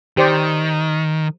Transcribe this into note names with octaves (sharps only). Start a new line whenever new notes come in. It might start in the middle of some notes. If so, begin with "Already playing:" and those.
D#3 G4 C5 D5